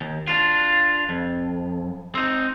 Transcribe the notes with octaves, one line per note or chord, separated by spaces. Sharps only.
D#2
D4 F4
F2
C4 D#4